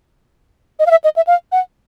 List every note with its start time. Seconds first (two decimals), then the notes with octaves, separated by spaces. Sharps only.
0.79 D#5
0.86 F5
0.91 E5
1.04 D#5
1.16 E5
1.27 F5
1.52 F#5